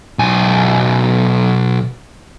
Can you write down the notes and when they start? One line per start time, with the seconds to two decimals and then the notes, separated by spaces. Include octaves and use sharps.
0.19 B1 G#5